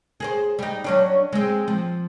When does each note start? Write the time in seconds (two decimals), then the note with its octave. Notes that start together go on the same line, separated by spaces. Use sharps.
0.20 G#4 A#4 C5
0.59 G3 D#4
0.84 F#3 C#4 D4
1.32 G#3 C4
1.68 F3